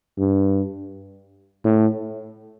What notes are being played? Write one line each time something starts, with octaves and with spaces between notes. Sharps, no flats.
G2
A2